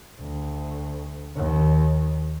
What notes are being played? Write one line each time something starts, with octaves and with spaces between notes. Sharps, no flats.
D2
D#2